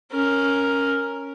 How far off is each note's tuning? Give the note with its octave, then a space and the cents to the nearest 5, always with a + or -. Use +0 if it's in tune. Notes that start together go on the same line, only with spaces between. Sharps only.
C#4 +0 A#4 +0